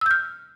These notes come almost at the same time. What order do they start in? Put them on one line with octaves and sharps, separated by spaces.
E6 G6 F6